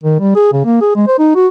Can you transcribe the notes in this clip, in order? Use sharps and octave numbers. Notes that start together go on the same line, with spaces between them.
D#3
G3
G#4
C#3
A#3
G#4
G#3
C5
D#4
F#4